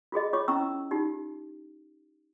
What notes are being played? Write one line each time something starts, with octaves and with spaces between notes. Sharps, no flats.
F4 F#4 G#4 D#5
F4 C#5 C#6 D6
C#4 E4 A#5 C#6 E6
D#4 F4 G4